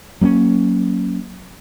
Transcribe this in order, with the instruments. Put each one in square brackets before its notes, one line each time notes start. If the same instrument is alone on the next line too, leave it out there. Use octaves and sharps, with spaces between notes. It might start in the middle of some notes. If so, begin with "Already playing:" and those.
[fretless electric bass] F#3 A#3 B3 C#4